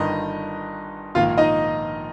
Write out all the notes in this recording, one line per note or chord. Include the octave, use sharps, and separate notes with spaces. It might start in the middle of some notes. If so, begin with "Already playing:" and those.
Already playing: G1 G2 D#3 D#4 D#5
A#1 G#2 D#3 A#3 F4 F5
D#4 D#5